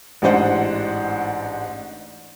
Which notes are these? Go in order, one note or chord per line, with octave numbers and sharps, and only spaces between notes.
A1 G#2 D4 C5 F#5